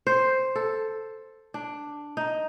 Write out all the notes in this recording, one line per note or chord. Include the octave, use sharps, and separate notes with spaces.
C5
A4
D4
D#4